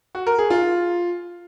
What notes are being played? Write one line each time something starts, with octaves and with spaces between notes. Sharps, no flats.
F#4
A#4
G#4
F4